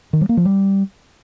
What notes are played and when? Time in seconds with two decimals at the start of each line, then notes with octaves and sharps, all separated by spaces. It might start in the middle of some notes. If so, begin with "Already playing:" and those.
0.13 D#3
0.21 G3
0.29 A#3
0.37 F3
0.45 G3